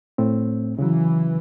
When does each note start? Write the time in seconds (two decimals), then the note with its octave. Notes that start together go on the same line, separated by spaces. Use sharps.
0.18 A2 A3 C4
0.79 C#3 E3 F#3